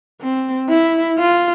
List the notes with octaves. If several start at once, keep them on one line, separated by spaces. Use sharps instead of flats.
C4
E4
F4